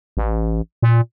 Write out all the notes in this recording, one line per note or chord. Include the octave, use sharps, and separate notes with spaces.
A1
A#2